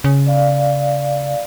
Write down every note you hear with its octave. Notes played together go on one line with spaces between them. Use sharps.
C#3
D5 F5